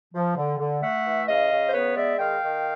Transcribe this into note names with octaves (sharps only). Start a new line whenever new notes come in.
F3
D3
D3
A3 E5 F#5
E3
C#3 D#5 F5
C#3
C5
B3 B4 C#5
G#3 D5 E5
D#3 F5 G5
D#3